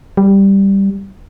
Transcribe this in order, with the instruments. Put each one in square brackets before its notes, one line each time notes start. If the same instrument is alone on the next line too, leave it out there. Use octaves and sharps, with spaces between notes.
[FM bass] G3